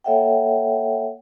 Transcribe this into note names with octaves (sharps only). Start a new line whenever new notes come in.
A#3 A4 C#5 E5 F#5 G5